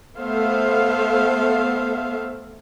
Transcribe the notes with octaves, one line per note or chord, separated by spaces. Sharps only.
A3 B3 A4 C5 E5 F5